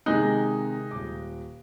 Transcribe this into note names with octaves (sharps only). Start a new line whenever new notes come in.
C3 D#3 G#3 D#4 F#6
D#1 D6